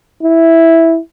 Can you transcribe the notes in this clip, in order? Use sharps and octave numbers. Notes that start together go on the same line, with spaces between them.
E4